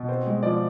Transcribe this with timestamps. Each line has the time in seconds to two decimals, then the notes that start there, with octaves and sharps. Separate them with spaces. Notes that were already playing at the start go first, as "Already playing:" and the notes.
Already playing: B2
0.09 C4 C5
0.27 G#3
0.43 F3 D5